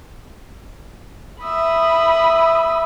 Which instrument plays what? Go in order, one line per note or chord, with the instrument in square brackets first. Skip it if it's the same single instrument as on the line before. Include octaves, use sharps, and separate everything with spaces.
[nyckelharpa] E5 [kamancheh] B5 D#6